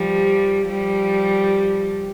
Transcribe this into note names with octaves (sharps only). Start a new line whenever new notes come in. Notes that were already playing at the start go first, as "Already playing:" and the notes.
Already playing: F3 G3
F3 G3